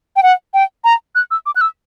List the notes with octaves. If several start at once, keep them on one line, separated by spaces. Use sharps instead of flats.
G5
F#5
G5
A#5
F#6
E6
D6
F#6
E6